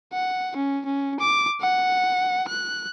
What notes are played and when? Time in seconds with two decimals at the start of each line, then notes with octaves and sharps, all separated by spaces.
0.13 F#5
0.56 C#4
0.86 C#4
1.20 D6
1.61 F#5
2.49 F#6